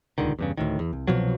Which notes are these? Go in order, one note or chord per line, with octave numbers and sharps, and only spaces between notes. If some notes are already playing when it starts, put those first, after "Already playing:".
D#1 C#2 D3 D#3
E2 G2 C#3
D2 A2 D#3
E2
C2
C2 B2 F3 F#3